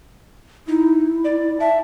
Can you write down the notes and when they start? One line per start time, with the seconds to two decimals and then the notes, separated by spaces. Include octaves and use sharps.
0.68 D#4 E4
1.24 D5
1.60 E5 A5